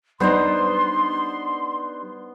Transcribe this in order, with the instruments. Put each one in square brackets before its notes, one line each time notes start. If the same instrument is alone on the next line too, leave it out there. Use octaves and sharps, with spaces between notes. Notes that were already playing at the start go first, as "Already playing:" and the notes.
[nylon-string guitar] G3 D4 D#4 [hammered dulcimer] B3 C5 [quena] C6